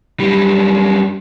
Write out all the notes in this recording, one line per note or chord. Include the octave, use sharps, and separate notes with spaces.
F#2 G3